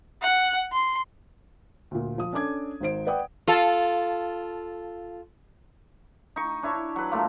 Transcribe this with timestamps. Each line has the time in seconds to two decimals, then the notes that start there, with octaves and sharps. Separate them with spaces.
0.22 F#5
0.72 C6
1.91 D2 A#2
2.18 F3 D#6
2.33 C#4 D4 A4 D6 G#6
2.81 G#1 D#4 C5 D7
3.07 B4 D5 F#5 G5 D#6
3.48 F4 A4
6.36 D#4 C#6
6.63 D4 E4 C#5
6.96 F#3 B4
7.11 A2 A3 A#3 F4